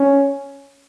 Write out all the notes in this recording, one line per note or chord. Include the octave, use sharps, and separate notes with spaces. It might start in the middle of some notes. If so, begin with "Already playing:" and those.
Already playing: C#4